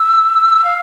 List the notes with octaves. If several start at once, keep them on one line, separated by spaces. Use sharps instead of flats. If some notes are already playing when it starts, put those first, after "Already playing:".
Already playing: E6
F5